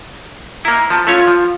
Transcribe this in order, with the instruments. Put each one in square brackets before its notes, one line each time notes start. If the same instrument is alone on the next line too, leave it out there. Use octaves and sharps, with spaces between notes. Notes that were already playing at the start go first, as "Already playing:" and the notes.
[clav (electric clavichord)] A#3 E4 [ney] A#5
[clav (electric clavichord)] F3 [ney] A5
[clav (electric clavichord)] A3 C#4 C#5 [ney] F4
[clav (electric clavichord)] F3